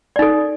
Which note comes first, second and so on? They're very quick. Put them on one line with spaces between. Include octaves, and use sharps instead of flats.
D5 D#4 A4